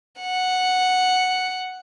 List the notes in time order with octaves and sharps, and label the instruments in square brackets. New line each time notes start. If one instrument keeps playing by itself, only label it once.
[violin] F#5